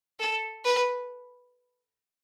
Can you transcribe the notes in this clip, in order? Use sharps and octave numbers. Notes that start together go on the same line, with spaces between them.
A4
B4